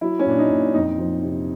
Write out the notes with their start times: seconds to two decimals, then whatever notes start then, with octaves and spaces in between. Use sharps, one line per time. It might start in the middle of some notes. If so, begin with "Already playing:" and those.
0.01 F#3 E4
0.19 C#4
0.26 A#2 D4
0.39 D#4
0.50 A#2
0.74 F2 D#4
0.98 F3
1.22 C3